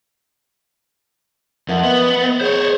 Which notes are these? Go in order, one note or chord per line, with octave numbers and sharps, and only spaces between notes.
F2 A#4 E5 F#5
B3 D#5
G#4 C5 C#5